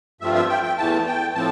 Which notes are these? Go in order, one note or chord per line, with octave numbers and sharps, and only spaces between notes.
G2 F3 A3 C4 F4 E5
E5
G5
G5
E2 E3 A3 A5
G5
A2 F3 A3 C4 A5